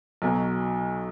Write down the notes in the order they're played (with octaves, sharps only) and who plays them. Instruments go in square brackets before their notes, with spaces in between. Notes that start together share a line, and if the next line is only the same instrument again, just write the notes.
[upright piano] B1 B2 F#3